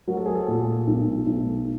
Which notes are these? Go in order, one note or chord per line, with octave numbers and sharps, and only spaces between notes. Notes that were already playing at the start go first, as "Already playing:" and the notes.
F#3 A#4
A4
G#4
A4
A#2
B1
B1